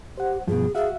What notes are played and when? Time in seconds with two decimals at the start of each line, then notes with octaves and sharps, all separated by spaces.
0.18 G4 C5 F#5
0.48 G2 B2 F3 G#4
0.75 F#4 G#4 E5 F5